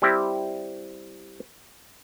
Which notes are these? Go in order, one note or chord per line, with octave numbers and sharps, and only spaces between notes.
G3 C4 E4 G4